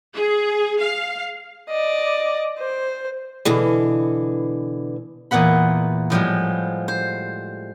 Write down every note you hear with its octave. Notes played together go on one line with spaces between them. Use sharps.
G#4
F5
D5 D#5
C5
B2 D3 E3
E2 A#2 B3 F#5 B5
A2 F3 G3 G#3
C5